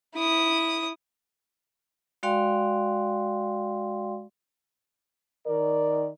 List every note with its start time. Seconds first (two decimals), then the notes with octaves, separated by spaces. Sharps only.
0.16 E4 D#6
2.23 G#3 F#4 D5 F5 G5 C6
5.47 D#3 A#4 D5